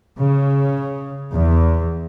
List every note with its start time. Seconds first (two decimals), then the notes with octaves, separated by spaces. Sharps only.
0.18 C#3
1.32 E2